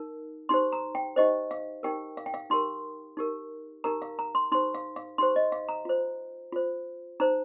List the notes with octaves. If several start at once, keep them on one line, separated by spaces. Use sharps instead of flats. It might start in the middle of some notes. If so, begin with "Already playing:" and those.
Already playing: D#4 A#4
D#4 G4 C5 C6
A#5
G5
D#4 G4 C5 D#5
F5
D#4 G4 A#4 G5
F5
G5
F5
D#4 G4 A#4 C6
D#4 G4 A#4
D#4 G4 A#4 A#5
F5
A#5
C6
D#4 G4 C5 C6
F5
F5
D#4 G4 C5 C6
D#5
F5
A#5
F4 C5
F4 C5
D#4 C5 A#5